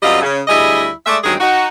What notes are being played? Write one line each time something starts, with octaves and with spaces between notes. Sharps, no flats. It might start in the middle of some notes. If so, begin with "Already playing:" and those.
F#2 G3 C4 F4 D#5
C#3
D2 G3 E4 G#4 D#5
G#3 A3 D5 E5
G2 D#3 F#3 G#3 C4 G#4
D#4 F#4